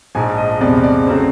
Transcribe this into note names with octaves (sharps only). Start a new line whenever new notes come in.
A#1 G#2 F3 G#5
D#5
E2 C3 F3 G#3 B3 D5
D5
C#3 F#3 A3 C4 C5